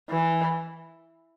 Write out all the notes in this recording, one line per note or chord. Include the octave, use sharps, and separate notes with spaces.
E3